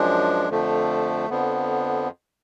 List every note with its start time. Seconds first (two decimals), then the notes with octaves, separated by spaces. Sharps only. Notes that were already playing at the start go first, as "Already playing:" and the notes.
Already playing: F#2 F3 G#3 D4
0.49 F2 D3 F3 A3
1.30 F2 D3 F3 B3